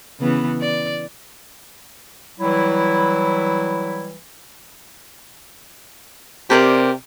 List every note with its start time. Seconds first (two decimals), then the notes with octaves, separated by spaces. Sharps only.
0.20 C#3 E3 B3
0.61 D5
2.40 E3 F#3 G3 E4
6.50 C3 G4 A#4 D5